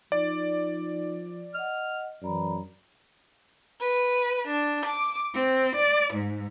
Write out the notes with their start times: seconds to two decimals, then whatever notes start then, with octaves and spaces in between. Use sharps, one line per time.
0.12 F3 D#4 D5
1.54 D#5 F#5 F6
2.22 F#2 E3 D5 A#5 B5
3.81 B4
4.47 D4
4.84 D6
5.34 C4
5.75 D5
6.14 G#2